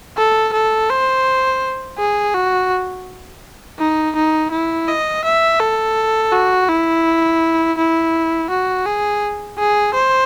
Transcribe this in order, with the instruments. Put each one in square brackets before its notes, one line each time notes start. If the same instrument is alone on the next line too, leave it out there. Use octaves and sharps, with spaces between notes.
[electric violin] A4
A4
C5
G#4
F#4
D#4
D#4
E4
D#5
E5
A4
F#4
E4
E4
F#4
G#4
G#4
C5